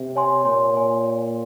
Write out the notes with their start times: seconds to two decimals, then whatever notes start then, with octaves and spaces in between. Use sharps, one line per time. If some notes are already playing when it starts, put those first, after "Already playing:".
Already playing: C3
0.16 C#5 G#5 C6
0.44 A#2 C#5 G#5 C6
0.75 C#5 G#5 C6